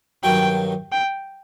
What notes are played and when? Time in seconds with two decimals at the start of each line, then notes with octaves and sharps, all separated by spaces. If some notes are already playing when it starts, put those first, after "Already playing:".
0.24 G2 D#3 F#3 G5
0.92 G5